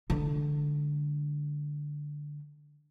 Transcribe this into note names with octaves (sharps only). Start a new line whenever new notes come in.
D3 G#3